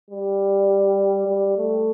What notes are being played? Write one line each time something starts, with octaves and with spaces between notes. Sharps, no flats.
G3
G3
A3